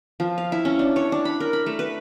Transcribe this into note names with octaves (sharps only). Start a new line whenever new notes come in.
F3
F5
E4
C#4
D4
C#5
D4
B5
A#4
B5
A3
B4